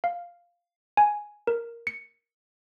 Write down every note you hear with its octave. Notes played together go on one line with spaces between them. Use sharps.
F5
G#5
A#4
C#7